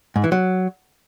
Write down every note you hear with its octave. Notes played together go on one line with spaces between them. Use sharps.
G#2
E3
F#3